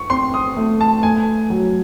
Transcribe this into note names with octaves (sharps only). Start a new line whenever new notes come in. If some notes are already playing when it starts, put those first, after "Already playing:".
Already playing: C#6
C4 C6
D#6
A3
A5
A3 G#5
F#3